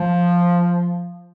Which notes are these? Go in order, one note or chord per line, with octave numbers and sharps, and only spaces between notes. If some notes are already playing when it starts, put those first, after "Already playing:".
Already playing: F3